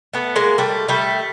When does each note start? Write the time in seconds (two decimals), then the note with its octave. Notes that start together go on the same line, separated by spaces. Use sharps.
0.13 A3 B3
0.36 G#3 A#3
0.58 G3 A3
0.88 G3 A3